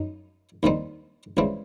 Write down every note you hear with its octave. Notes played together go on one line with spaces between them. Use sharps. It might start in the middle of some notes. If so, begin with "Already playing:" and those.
Already playing: F#2 D#4
D#2 D#3 G3 C4 D#4
C#2 C#3 E3 G3 C4